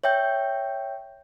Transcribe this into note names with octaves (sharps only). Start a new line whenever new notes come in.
C#5 E5 G5 G6